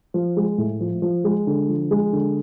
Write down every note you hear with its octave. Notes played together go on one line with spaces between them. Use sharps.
F3
G#3
A2
F3
F3
G#3
D3
F3
G#3
D3